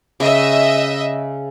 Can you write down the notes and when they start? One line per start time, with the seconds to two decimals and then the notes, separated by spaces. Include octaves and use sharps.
0.20 C#3 D#5 E5